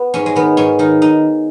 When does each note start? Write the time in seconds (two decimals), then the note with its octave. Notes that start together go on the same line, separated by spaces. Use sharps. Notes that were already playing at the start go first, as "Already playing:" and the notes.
Already playing: B3
0.14 G#2 C#4
0.26 G#3
0.35 D#3 B3
0.57 G#2 C#4
0.79 D#3 D#4
1.02 D#4